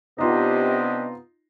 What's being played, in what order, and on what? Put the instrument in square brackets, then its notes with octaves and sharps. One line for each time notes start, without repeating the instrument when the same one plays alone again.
[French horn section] C3 B3 [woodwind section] D4 G4 D#5 [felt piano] D#4 F4